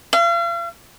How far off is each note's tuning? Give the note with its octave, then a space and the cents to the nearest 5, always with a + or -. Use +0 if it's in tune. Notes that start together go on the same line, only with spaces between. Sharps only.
F5 -40